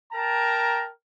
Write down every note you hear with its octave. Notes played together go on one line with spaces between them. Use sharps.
A#4 G5 A5 A#5